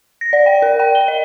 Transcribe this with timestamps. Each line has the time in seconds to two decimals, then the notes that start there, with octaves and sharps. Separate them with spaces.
0.21 A#6
0.33 D5
0.46 G5
0.62 A#4
0.80 G5
0.95 G7
1.08 D#5